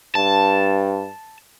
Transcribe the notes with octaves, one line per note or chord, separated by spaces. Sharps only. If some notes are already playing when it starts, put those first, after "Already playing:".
G2 A5